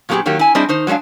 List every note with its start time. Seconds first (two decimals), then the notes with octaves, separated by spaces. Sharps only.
0.09 A#2 F#3 A3 B3 G4 G#4
0.26 D#3 F#3 A#3 G4
0.39 E4 G#5
0.55 G3 C4 D4 E4 G#4 D#5
0.69 D#3 D#4 C5
0.87 F#3 G#3 A3 D4 F5